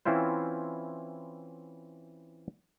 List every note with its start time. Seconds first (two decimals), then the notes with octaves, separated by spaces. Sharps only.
0.05 E3 C4 C#4 E4 F4 C5